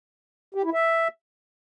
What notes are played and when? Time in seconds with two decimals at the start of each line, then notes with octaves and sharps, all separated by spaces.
0.55 G4
0.64 E4
0.74 E5